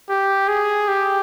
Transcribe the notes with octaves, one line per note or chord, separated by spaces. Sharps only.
G4
G#4
G4